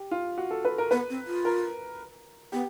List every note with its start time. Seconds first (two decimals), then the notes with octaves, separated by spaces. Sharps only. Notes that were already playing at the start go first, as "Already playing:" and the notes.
Already playing: G4
0.11 F4
0.38 F#4
0.51 A4
0.65 B4
0.78 A#4
0.91 B3 B4
1.10 C4
1.27 F4
1.45 A#4
2.52 B3 G4